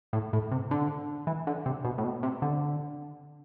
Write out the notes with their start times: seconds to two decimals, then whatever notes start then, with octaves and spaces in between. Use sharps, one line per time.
0.13 A2
0.33 A2
0.51 C3
0.71 D3
1.27 E3
1.47 D3
1.66 C3
1.85 B2
1.98 A2
2.04 B2
2.23 C3
2.42 D3